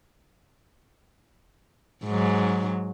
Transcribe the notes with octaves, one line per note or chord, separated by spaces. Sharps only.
G#2 F#3